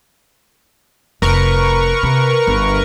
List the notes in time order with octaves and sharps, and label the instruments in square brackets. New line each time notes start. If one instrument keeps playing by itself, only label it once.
[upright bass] F1 [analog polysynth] A#4 B4 C#6
[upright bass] C3
G1